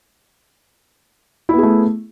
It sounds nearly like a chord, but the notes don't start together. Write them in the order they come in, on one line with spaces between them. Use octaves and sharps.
E4 B3 G#4 A3